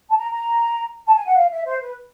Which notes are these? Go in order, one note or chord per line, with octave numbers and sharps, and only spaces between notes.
A5
A#5
A#5
A5
G#5
F#5
F5
E5
C5
B4